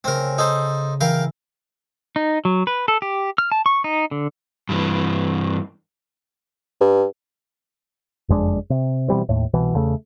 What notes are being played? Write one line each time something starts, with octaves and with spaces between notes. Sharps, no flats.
C#3 A3 C4 A#4
D#4 A4 C5
E3 A#4 F5 G5
D#4
F#3
B4
A4
G4
F6
A5
C#6
D#4
D3
G2 E3
G2
F#1 F2 G#3 D4
C3
B2 E3 G3 C4
D#2 A2
C2 B2 E3
E2 C#3 A3